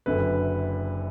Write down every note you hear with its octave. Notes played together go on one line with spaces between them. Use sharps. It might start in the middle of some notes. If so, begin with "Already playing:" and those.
F#1 F#2 D3 B4